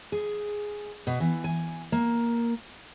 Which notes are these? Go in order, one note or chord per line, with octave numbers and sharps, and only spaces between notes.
G#4
B2
E3
G#5
A#3